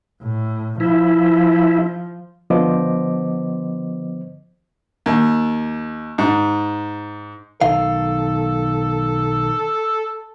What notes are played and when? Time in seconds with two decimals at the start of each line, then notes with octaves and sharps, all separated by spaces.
0.23 A2
0.80 F3 E4
2.50 D3 F3 B3 C5 D#5 D6
5.06 D#2
6.18 G#2
7.62 B1 D#3 A4 F5